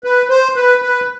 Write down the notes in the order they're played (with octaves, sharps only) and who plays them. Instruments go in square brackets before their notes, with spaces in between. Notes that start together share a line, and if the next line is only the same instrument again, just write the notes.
[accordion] B4
C5
B4
B4